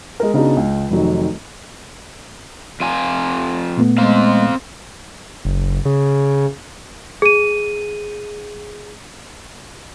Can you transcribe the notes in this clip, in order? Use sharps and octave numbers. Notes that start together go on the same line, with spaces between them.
G#3 A#4
C#3 B3 D4 D#4 F#4 G#4
C#2
F1 D#3 F#3
F2 F4 G#5
A#2 A3 B3
G#3 C4 F5
F#1
C#3
G#4 D#7